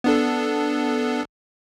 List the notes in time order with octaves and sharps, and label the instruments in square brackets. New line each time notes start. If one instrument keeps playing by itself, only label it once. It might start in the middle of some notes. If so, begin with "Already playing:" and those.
[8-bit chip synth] B3 D4 A4